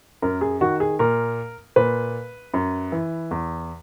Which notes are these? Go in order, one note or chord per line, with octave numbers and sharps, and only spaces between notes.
F#2 A#4
G#4
D#3 F#4
G#4
A#2 A#4
A#2 B4
F#2
E3
E2